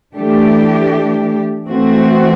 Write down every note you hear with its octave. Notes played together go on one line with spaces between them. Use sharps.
E3 A3 D4 G4
E3 A3 C4 F#4